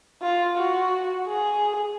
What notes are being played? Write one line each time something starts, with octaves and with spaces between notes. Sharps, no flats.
F4
F#4
G#4